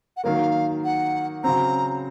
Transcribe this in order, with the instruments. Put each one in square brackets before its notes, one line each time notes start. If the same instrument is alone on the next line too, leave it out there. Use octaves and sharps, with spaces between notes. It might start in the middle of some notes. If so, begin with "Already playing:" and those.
[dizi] F#5
[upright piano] D#3 F#3 A#3 [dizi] F5
[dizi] F#5
[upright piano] C#3 F#3 C4 [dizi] A#5